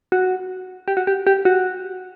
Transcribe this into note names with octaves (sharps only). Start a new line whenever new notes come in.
F#4
G4
F#4
G4
G4
F#4